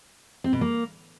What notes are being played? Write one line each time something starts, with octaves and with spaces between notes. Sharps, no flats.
C4
B2
A#3